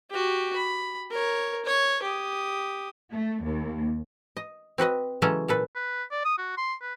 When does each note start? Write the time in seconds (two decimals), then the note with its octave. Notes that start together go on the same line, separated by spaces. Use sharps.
0.11 F#4 G4
0.56 B5
1.11 A#4 C#5
1.65 C#5
2.03 G4 D#6
3.11 A3
3.44 D#2
4.37 D#5
4.78 C4 F#4 B4 D#5
5.22 C#3 E3 F#3 G#3 C#4 A4
5.48 A#2 A4 B4
5.75 B4
6.11 D5
6.25 D#6
6.38 F#4
6.57 C6
6.81 B4